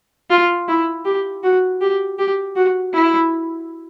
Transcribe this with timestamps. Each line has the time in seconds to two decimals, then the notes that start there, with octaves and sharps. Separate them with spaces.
0.30 F4
0.68 E4
1.05 G4
1.43 F#4
1.81 G4
2.18 G4
2.56 F#4
2.93 E4